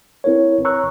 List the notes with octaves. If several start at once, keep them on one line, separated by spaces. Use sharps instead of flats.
C4 E4 A#4 B4 C#5
C#5 A#5 C#6 E6 F#6